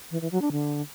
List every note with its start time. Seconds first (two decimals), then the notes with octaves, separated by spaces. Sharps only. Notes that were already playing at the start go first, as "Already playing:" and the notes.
0.11 E3
0.21 E3
0.31 F#3
0.42 D4
0.52 D3